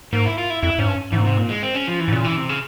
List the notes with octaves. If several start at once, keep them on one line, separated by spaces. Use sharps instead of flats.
G#2 A#3
E4
F4
E4
F2 E4
G#2 C#4
G2
G#2 E3
A#2
C3
A#2
G#3
C4
C#4
F3
E3
G#2
A#2 C#3
E3
C3
C#3